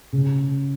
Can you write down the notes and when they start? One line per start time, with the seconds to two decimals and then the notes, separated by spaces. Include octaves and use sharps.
0.13 C#3